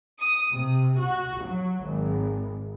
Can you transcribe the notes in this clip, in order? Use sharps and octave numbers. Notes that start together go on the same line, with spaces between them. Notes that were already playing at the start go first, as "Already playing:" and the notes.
D#6
C3
F#4
F#3
G#1